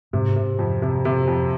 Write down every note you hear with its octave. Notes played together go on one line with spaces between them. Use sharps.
G#2 C3
C3
F2
C3
C3
F2